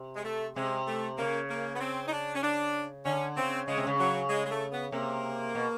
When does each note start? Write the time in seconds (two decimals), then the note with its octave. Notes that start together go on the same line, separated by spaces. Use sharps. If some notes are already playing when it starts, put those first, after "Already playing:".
Already playing: C3
0.16 G#3
0.25 A3
0.56 C3 G#3
0.87 A3
1.18 C#3 A#3
1.49 A#3
1.75 B3
1.81 C4
2.07 D#4
2.12 D4
2.35 C#4
2.43 D4
3.05 D3 C#4
3.37 C#3 C4
3.68 C#3 G#3
3.78 C3
3.87 C#3
3.99 F#3
4.30 G#3
4.46 G#3
4.51 A3
4.72 B3
4.92 C3 A#3
5.55 B2